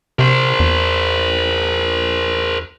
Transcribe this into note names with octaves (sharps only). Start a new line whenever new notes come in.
C3 A#4 C5
E2